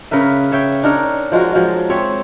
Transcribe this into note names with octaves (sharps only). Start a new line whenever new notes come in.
C#3 A#4 B4 E5
C#5 E5 G5
D4 D#4 A#4 C#5
F3 G#3 F#4 A#4
F3 F#3 G#3
C4 C#5 E5